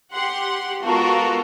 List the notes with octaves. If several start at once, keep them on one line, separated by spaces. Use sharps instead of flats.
G4 F#5 C6
G#3 B3 F4 F#4 A4 A#4